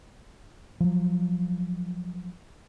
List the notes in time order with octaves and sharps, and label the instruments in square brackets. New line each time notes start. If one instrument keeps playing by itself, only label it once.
[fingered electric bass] F3 F#3